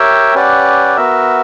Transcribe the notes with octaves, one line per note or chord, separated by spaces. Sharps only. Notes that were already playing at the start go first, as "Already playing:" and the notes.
Already playing: G4 A#4 C#5 E5 G5
C#4 G4 B4 D5 F#5
B3 F#4 A#4 E5